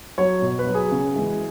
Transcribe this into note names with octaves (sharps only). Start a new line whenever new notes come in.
F#3 C#5
B2
B4
F#3
G#4
C#3
E3 G#3